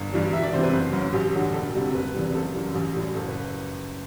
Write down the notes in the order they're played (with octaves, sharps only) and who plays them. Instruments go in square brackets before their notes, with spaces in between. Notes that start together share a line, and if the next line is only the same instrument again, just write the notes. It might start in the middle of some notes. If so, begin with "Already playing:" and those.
Already playing: [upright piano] G1
G2 E3 G3
E1 E5
D5
E2 C3 E3 C5
B4
F#1 C5
F#2 F#3
A1 G4
G2 D3 F#3
E1 A4
D2 C3 G3
F#1 B4
E2 C3 E3 G3
F#1 A4
F#2 E3 G3
A1 G4
A2 G3
F#1 A4
B4